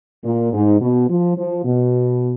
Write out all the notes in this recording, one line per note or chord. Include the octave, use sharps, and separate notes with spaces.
A#2
G#2
B2
F3
F3
B2